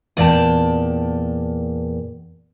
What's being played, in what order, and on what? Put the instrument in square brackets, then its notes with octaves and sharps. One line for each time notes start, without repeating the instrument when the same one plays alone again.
[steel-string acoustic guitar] E2 A#2 D5 G5 A5